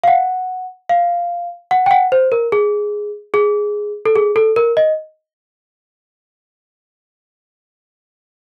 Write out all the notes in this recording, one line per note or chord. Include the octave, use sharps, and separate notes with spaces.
F5
F#5
F5
F#5
G5
F#5
C5
A#4
G#4
G#4
A4
G#4
A4
A#4
D#5